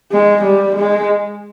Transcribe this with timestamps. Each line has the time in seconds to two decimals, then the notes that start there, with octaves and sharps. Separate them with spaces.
0.12 G#3
0.44 G3
0.76 G#3